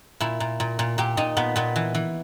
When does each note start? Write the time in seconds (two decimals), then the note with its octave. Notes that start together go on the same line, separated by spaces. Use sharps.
0.20 A#2 E4
0.40 A#2
0.60 A#2
0.79 A#2
0.98 A#2 G4
1.17 A#2 D#4
1.37 A#2 B3
1.56 A#2 B3
1.76 E3
1.95 E3